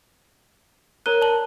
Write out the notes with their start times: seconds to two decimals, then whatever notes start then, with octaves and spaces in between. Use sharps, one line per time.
1.06 A#4 C#5 A#5 F#6 D#7 G7
1.21 D5 A5 F#7